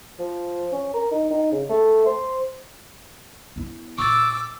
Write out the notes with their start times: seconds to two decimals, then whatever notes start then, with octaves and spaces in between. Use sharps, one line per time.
0.19 F3
0.73 C#4
0.94 A#4
1.11 D#4
1.31 D#4
1.52 C#3
1.69 A3
2.06 C5
3.56 B3 E4
3.98 A#2 C#6 D6 E6 A6